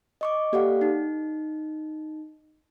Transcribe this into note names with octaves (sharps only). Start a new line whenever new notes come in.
D#5 C#6 D6
A#3 G4 A4 D5 F5 F#5
D#4